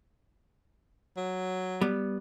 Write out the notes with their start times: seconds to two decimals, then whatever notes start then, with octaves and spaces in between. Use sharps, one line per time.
1.17 F#3
1.81 G3 B3